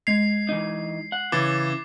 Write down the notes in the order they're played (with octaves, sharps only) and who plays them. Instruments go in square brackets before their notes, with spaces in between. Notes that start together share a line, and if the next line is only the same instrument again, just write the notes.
[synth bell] G#3 G#6 F7 [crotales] C7
[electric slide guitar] E3 D#4
F#5
[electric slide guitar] C#3 [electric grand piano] E3 [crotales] D6 [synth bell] G#6 A6